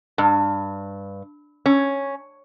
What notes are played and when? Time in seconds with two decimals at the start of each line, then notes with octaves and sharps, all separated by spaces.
0.18 G2
1.66 C#4